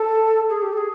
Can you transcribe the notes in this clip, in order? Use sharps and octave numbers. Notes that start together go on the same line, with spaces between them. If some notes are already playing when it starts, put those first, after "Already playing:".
Already playing: A4
G#4
G4
A4
G#4